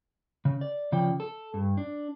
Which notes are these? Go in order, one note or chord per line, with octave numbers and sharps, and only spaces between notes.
C#3
D5
C#3 F3 D5 G5
A4
G2
D4